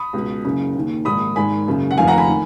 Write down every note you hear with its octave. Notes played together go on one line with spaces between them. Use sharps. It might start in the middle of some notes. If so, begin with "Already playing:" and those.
Already playing: B5 D#6
C#2 B2
F#1 F#2 C#3
D#2 D#3
A#1 G#2 D#3 B5 D#6
G#1 G#2 D#3 G#5 B5
F#1 F#2 C#3
F#5
F1 F2 D#3 F5 G#5
F#5 A#5
G#5 B5
D#3